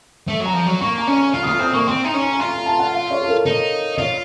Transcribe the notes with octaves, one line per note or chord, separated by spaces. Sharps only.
A3
F#3
A#5
F3
F#3
A#3 C#6
A#5
C#4
C#6
F4 F6
D#6
F4 F6
C4 D#6
A#3 C#6
C4 C6
D#4 A#5
C#4
A#5
A#5
F4 C6
A#5
A5
F#5
F5
C#5
A4
A#4
D#4
F4 C#5